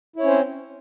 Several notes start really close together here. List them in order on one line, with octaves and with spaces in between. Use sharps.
E4 C#5 C#4 C5 C4